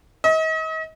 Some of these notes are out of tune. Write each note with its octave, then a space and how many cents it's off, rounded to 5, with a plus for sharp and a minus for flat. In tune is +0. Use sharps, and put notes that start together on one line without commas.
D#5 +40